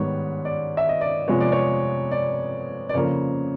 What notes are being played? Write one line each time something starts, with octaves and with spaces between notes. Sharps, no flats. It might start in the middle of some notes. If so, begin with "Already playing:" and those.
Already playing: G#2 D#3 G3 B3 C#5
D5
E5
D#5
D5
F2 C3 F3 G#3 B3 C#5
D5
C#5
D5
D5
F2 C#3 F3 A#3 C#5